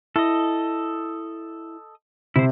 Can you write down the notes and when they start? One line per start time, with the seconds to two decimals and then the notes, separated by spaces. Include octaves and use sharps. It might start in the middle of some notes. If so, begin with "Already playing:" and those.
0.16 E4 A4 D#5
2.36 C3 E4 C5